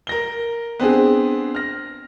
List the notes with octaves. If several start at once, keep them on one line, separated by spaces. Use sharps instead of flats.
A#4 A#6 G7
B3 C4 D4 G#4
F6 A#6